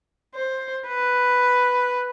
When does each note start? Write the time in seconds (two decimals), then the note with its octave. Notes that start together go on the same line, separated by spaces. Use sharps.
0.35 C5
0.88 B4